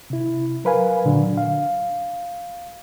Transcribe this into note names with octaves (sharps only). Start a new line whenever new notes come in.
C3 E4
F#3 A#4 B4 F5 G#5
A#2 D3 F#3 D4
F5